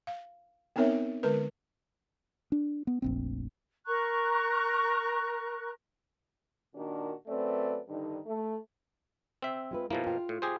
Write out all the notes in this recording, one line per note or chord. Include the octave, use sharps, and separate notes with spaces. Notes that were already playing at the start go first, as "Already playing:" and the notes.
F5
B3 C4 D#4 A#4 C#5 E5
D3 G#3 A#4 B4
D4
B3
F1 A#1 C4
A#4 A#5 C#6 F#6
A#2 D#3 D4 F#4 A#4
F#2 A3 C4 B4 D5
G2 D3 D#3 D#4
A3
C4 E5
G#3 F4 B4
B2 F3 A#3 E4 G#4
F4 G5
A2
G4 G#4 C5